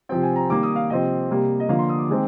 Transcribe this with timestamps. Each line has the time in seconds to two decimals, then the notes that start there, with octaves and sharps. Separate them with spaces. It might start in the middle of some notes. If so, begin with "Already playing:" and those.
0.09 C3 F3 C4 G5
0.23 G#5
0.36 A#5
0.50 D#3 G3 A#3 D6
0.63 D#6
0.76 F5
0.90 C3 F3 C4 D#5
1.30 C3 G3 A#3
1.60 D#5
1.69 D3 F3 A#3 F5
1.79 C6
1.89 D#6
1.99 D6
2.09 D#3 G#3 C4